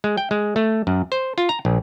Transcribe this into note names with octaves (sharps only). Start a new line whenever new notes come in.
G#3
G5
G#3
A3
F#2
C5
F4
A#5
A#1